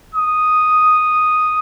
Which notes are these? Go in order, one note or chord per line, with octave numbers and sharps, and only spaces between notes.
D#6